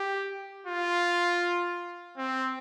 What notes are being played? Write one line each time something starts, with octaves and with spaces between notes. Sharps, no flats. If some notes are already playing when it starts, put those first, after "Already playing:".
Already playing: G4
F4
C4